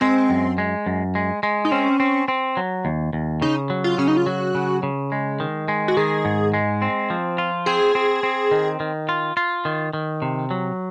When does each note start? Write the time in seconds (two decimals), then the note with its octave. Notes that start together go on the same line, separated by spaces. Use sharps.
0.01 G#3 C4
0.30 F#2
0.58 G#3
0.86 F#2
1.15 G#3
1.43 G#3
1.65 D#4
1.71 C4 C#4
2.00 C4
2.28 C4
2.57 F#3
2.85 D#2
3.13 D#2
3.42 C#3 D#4
3.70 F#3
3.84 F4
3.98 C#3 C#4
4.08 D#4
4.17 F4
4.26 F#3 F#4
4.55 C#3
4.83 C#3
5.12 G#3
5.40 D#3
5.68 G#3
5.88 F#4
5.97 D#3 G#4
6.25 G#2
6.54 G#3
6.82 C4
7.10 F3
7.38 F4
7.66 C4 G#4
7.95 C4
8.23 C4
8.51 D#3
8.80 D#3
9.09 F4
9.37 F4
9.65 D#3
9.93 D#3
10.22 C3
10.51 F#3